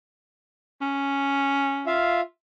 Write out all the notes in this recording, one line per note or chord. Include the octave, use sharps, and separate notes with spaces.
C#4
F4 E5 F5